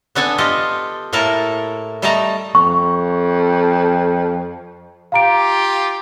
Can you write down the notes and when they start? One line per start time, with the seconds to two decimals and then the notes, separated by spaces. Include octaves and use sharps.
0.15 B3 D4 A4 G#5
0.38 F4 G4 A4 D#5
1.13 A2 A#3 E4 A4 A#4 A5
2.02 G3 A3 D5 D#5 A5 A#5
2.55 F2 C#6
5.12 F4 G4 F5 A#5 D7